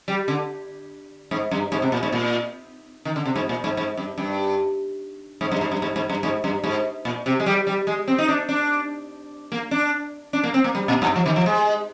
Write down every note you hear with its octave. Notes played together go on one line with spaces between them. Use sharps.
G3
D3
G#2
G2
G#2
C3
A#2
G#2
A#2
D#3
D3
C3
G#2
A#2
G#2
G#2
G2
G2
G#2
G2
G#2
G2
G#2
G#2
G2
G#2
G2
G#2
A#2
C3
G#3
G3
G3
G#3
C4
D#4
D4
D4
A#3
D4
D4
A#3
C4
A#3
G3
A#2
G2
F3
D#3
F3
G#3